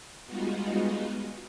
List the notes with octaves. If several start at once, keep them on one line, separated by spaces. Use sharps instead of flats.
G3 G#3 B3 D#4 F4 F#4